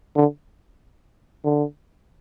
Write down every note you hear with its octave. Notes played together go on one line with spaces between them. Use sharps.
D3
D3